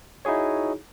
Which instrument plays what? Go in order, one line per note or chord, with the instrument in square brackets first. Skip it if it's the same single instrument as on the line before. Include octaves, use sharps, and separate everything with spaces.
[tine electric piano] D#4 E4 F#4 G#4 C#5